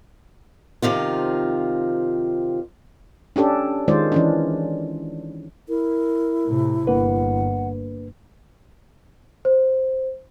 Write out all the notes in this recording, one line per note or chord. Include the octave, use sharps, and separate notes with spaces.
C3 D#3 F3 F4
C#4 D4 G4 A4
D#3 G#3 F4 C5 D5
E3 C#4 D4
E4 A#4
A2 C3
G1 A#3 D4 B4 F#5
C5